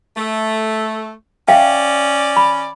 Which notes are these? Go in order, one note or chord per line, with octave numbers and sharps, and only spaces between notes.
A3
C#4 D5 E5 F5 G5
B5